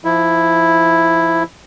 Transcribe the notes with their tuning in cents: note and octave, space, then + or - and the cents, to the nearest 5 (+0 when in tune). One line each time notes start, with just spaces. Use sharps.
F3 -20 E4 +0